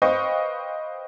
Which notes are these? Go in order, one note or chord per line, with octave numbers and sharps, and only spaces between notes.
B4 C5 D#5 F5 G5 C#6